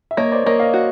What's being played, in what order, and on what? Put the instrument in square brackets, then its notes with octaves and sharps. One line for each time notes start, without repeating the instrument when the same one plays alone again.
[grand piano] E5
[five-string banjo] A#3 [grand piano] C#5 D#5
[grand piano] C5 D5
[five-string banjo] A#3 [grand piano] C#5 D#5
[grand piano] D#5 F5
[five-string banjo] F#4